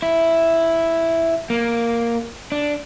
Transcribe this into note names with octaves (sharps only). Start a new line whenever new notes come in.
E4
A#3
D4